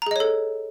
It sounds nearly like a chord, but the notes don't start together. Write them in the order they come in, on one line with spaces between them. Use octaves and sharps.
A#5 G#4 D#5 C#5 A4